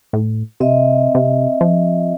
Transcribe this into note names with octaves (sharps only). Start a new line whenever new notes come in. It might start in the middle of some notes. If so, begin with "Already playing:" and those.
A2
C3 C4 D#5 E5
C3
F3